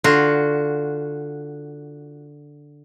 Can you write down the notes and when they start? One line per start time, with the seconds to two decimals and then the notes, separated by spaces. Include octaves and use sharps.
0.04 D3 F4 F#4